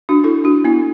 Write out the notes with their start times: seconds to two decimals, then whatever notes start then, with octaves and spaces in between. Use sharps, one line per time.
0.09 D4 F#4
0.24 E4 A4
0.44 D4 F#4
0.64 B3 E4